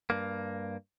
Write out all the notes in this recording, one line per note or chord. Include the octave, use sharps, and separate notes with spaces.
G2 A#3